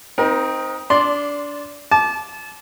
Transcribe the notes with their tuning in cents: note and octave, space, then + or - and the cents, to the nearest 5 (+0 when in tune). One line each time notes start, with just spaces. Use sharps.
C4 +0 D#4 +5 A#4 +40
D4 -20 D5 +0 C6 +0
A5 -30 D6 +0